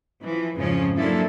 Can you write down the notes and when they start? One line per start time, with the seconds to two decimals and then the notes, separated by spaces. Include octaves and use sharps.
0.21 E3 F3
0.55 F2 G#2 C#3 F3 C#4
0.97 F3 F#3 A#3 D4 E4 A4